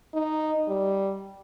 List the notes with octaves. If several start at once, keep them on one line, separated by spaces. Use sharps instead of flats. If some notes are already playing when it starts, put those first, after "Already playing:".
D#4
G3